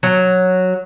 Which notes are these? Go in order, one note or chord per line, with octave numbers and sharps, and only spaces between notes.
F#3